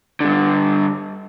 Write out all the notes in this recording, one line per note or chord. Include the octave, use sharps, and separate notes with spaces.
G2 D3